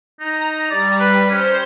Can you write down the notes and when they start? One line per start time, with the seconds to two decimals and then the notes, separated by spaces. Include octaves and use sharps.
0.20 D#4 A#5
0.70 G3 D5
1.00 B4
1.30 C#4 C5 G6